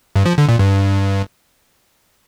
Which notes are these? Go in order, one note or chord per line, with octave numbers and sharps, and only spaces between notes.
G2
F3
D3
A#2
G2